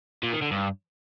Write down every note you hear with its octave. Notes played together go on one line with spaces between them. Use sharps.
A#2
D#3
D3
G2